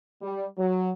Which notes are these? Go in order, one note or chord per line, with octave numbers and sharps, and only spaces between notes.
G3
F#3